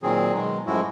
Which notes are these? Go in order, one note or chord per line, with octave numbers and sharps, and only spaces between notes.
A#2 D#3 F#3 C4 G#4
B2 D#3 F#3 G#3
F#2 A2 F3 G#3 E4 F#4